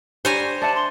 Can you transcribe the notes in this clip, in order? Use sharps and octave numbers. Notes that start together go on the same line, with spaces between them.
G2 G3 C5 C#5 G#5 A#5
D5 E5 F#5 A5
C6